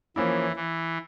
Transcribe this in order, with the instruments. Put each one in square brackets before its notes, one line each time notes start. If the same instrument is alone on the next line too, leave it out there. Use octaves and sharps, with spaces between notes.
[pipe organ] E3 [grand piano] F3 A#3 C#4 E4
[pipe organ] E3